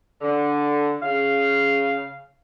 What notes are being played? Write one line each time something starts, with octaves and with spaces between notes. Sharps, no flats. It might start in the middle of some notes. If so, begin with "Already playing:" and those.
D3
C#3 F5